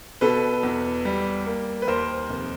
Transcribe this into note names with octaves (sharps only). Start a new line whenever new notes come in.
B2 A4 B4
E2
G3
A#3
B4
D#2 A#4 C5
F1